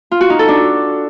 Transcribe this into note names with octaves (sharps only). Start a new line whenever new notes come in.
F4
F#4
D#4
A4
D4